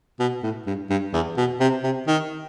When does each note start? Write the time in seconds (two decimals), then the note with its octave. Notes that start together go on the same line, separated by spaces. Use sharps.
0.19 B2
0.43 A2
0.66 G2
0.90 G2
1.13 E2
1.37 B2
1.60 C3
1.83 C3
2.07 D#3